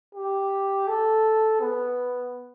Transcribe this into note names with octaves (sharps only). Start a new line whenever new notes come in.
G4
A4
B3